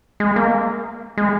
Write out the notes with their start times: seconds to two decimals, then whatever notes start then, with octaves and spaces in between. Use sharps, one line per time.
0.20 G#3
0.36 A#3
1.17 G#3